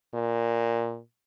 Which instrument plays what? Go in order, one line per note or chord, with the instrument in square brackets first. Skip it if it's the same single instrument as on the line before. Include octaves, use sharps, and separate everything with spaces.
[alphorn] A#2